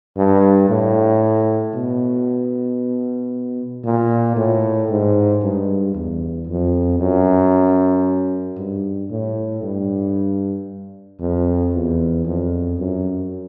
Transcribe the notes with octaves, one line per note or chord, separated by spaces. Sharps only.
G2
A2
B2
A#2
A2
G#2
G2
E2
F2
F#2
G2
A2
G2
F2
E2
F2
F#2